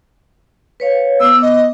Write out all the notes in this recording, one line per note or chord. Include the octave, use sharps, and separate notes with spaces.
B4 C#5 F5
B3 D6 E6
D#5